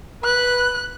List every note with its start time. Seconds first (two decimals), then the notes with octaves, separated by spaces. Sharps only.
0.24 B4 F#6